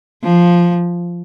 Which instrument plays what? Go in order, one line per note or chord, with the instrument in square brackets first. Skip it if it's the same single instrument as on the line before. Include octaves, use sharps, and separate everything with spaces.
[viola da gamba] F3